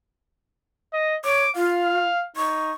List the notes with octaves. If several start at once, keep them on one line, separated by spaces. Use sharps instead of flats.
D#5
C#5 D6
F4 F5
D#4 C#6